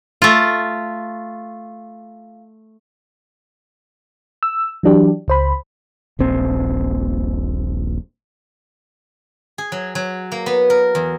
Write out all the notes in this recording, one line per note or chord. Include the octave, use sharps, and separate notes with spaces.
A3 F4
E6
E3 F#3 D4 G4
C#2 C5 B5
D#1 A#1 C4
G#4
F#3
F#3
A#3
B3
A#4
E2